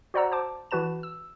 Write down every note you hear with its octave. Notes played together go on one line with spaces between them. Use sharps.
F#4 C5 D5 F#5 A#5 E6
C5 A5 D6
E3 F#4 B4 A5 E7
E6